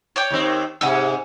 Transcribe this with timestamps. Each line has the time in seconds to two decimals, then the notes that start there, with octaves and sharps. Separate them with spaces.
0.16 C#5 D5 G5
0.30 D#2 D#3 C4
0.81 G#2 C3 F#5 G#5 E6